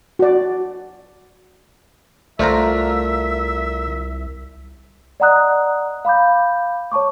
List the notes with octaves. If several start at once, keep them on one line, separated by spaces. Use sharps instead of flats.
F#4 D5
C2 A3 F4 A#4 C5 D5 E5 A#5
D5 D#5 F#5 A#5 D#6 F#6
F5 B5 D6 G6
C#5 A5 C#6 D6